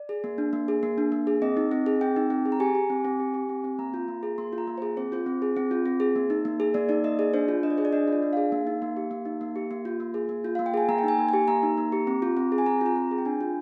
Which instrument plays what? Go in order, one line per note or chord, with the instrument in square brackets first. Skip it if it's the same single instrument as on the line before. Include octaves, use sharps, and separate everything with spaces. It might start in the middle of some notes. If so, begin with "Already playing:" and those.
Already playing: [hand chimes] D5
G#4
A#3
D4
A#3
G#4
A#3
D4
A#3
G#4
C4 D#5
D#4
C4
G#4
C4 G5
D#4
C4
G#4
A#5
G4 G#5
G4
C4
C4
G4
G4
C4
C4
A#3 A#5
F4
A#3
G#4
A#3 C6
F4
A#5
A#3
G#4 C5
C4 C5
F4 C5
C4
G#4
C4
F4
C4
G#4
A#3
D#4
A#3
G#4
A#3 D5
D#4 D5
A#3 D#5
G#4 D5
D4 C5
F4
D4 D#5
D5
G#4 C5
D5
D4 D#5
F4
D5
D4
G#4 F5
A#3
D#4
A#3
G4
A#3
D#4
A#3
G4
A#3
F4
A#3
G#4
A#3
F4
A#3 F5
G5
G#4 G#5
A#3 A#5
G5
D#4 G#5
A#3
G4 G#5
A#3 A#5
D#4
A#3
G4
C4
F4
C4
G#4
G#5
C4 A#5
F4
A#5
C4
G#4
G5
D4 G#5
F4